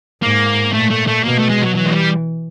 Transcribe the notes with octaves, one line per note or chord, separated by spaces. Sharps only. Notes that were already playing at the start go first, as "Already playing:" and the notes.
G#2 A#3
A#2 A3
A3
A3
B2 A#3
A3
G#3
F#3
E3 F#3
G#3
G3